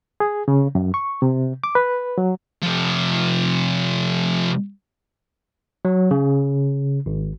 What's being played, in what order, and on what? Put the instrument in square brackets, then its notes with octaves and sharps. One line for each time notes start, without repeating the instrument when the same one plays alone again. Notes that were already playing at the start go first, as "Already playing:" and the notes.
[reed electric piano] G#4
C#3
F#2
C#6
C3
D6
B4
F#3
[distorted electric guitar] C3 F3
[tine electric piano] F#3
C#3
G#1